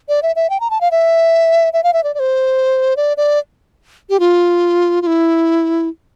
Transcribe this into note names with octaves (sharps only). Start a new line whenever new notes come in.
D5
E5
E5
G5
A#5
A5
F5
E5
E5
F5
E5
D5
D5
C5
D5
D5
G4
F4
F4
E4